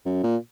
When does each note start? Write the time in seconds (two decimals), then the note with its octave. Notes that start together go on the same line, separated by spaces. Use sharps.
0.05 F#2
0.23 A#2